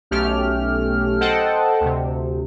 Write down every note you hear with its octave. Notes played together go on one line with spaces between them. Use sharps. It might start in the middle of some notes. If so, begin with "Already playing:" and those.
B1 A3 C#4 G4 F6
A4 C5 D#5 F#5 G5 A5
D2 C3